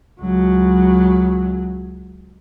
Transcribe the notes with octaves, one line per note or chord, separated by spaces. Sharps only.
C#2 F#3